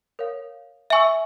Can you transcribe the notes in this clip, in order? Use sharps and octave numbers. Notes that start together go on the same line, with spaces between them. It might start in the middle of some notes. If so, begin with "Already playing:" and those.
A#4 C#5 F5
E5 G#5 C#6 E6